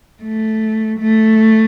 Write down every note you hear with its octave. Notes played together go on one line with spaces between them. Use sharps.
A3
A3